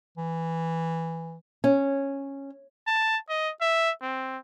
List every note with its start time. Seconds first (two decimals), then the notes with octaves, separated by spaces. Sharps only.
0.17 E3
1.64 C#4
2.87 A5
3.29 D#5
3.61 E5
4.02 C4